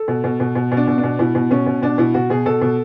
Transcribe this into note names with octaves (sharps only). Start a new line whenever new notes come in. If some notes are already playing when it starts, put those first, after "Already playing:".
Already playing: A4
B2
B2
B2
B2
B2
D4
B2
D4
B2
B2 E4
B2
B2 C#4
B2
B2 D4
B2 E4
B2 F#4
B2 G#4
B2 A4
B2